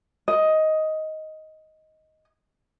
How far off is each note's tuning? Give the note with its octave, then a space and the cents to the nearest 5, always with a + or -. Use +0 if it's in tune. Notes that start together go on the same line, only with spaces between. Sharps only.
D#5 +10